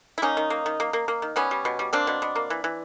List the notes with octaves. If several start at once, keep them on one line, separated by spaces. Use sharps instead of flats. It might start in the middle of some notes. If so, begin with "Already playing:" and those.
E4
A#3 C#4 D#4
D#3
A#3
D#3
A#3
A#3
A#3
D#3
G3 B3 C#4
G3
B2
G3
A#3 C4 D4
B2
B2
A#3
E3
E3